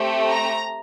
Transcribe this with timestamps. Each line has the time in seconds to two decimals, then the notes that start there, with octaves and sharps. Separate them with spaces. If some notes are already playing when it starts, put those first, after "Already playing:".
Already playing: A3 C4 G4
0.31 A#5